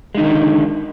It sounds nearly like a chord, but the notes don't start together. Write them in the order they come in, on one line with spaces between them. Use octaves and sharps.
G#3 D#4 D#3 D3